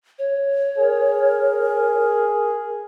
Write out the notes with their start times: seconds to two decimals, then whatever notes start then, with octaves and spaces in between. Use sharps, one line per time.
0.19 C#5
0.78 G#4 A#4